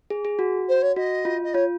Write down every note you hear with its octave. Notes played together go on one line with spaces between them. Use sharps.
G#4
G#4
F#4
C5
C#5
F#4 D#5
F4
D#5
F4 C#5